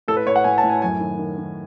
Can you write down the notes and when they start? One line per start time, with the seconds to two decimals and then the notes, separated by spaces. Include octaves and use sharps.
0.08 A2 A4
0.16 B4
0.26 A2 C#5
0.36 F#5
0.44 A2 G#5
0.58 A5
0.63 A2
0.70 G#5
0.82 F#2 G#5
1.00 D#3
1.19 D#3
1.38 D#3